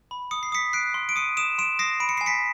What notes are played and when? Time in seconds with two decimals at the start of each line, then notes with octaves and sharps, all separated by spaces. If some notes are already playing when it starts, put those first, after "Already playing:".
0.11 B5
0.31 D#6 C#7
0.43 C7
0.52 D#6 B6 C#7
0.73 F#6 C7 D7
0.94 C6
1.09 D7
1.16 D#6 C#7 D#7
1.37 D#6 D7 E7
1.58 C6 D7 E7
1.79 D#6 A#6 C7
2.00 B5 D7
2.09 C#7
2.17 G#5 C7
2.26 B6 C#7